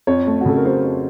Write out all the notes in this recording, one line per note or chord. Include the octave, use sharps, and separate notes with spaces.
F2 C#5
A3
F#4
C#3 A4
A#4
F#3 C5
F2